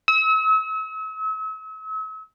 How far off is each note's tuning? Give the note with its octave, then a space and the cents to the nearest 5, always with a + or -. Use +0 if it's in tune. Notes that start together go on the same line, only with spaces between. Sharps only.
E6 -40